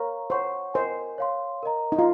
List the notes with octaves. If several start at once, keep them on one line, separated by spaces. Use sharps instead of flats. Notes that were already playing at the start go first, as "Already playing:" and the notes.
Already playing: A#4 C#5 F5 A#5 C#6
C5 C#5 F#5 C#6
A#4 C5 D#5 G#5
C#5 F5 C6
A#4 D#5 A#5
D#4
F4